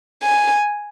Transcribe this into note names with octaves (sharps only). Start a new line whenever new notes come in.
G#5